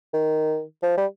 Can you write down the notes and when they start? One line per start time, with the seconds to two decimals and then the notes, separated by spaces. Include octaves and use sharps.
0.13 D#3
0.83 F3
0.97 G3